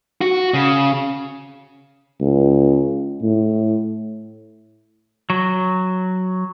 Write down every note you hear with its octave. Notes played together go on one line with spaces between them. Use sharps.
F#4
C#3
C#2
A2
F#3